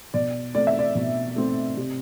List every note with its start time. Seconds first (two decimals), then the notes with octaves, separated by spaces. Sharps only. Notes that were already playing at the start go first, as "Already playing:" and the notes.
0.14 B2 D5
0.55 A3 C4 D5
0.67 E5
0.79 D5
0.95 B2
1.36 A3 C4
1.77 C3